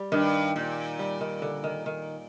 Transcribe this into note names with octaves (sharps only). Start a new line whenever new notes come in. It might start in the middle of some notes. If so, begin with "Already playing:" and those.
Already playing: G3
G2 D#3
A#2
G3
D#3
D3
D#3
D#3